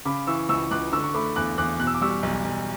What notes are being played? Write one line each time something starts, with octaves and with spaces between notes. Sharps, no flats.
C#3 B5 D6
E3 C#6 E6
C#2 C#6 E6
C#2 D6 F#6
D3 C#6 E6
C#6
A3 B5 D6
E2 D6 F#6
E2 D6 F#6
B2 F#6
E6
D6
G3 C#6 E6
B1
B1